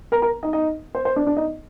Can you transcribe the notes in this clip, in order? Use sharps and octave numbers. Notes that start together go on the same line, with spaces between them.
A#4 A#5
A#4 A#5
D#4 D#5
D#4 D#5
C5
C5
D4 D5
D4 D5
D#4 D#5